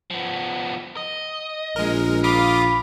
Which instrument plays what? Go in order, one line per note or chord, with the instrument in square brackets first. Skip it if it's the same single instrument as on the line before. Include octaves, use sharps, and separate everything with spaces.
[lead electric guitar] F3 B3
D#5
[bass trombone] A#1 [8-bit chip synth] G#3 A#4
[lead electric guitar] F4 [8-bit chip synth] F5 D6 D#6 [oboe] B5